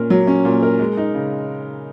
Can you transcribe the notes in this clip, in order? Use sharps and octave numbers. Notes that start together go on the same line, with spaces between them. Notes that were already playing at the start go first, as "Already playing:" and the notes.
Already playing: A#2 C#4 A#4
F#3
C#4
A#2
A#4
G#3
D#4
C#3